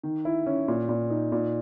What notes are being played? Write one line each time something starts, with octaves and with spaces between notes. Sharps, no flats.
D#3
E4
C#4
A#2
A#2
D#4
A#2